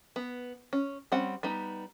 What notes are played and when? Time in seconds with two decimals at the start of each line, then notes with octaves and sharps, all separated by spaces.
0.16 B3
0.73 C#4
1.12 G3 C4 C#4 F#5
1.43 G3 B3 D#4